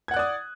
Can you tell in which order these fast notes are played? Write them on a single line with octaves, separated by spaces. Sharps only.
G#6 F#5 F#6 D5 D#6